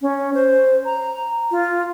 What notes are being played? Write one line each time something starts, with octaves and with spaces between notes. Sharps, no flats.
C#4
C5
A#5
F4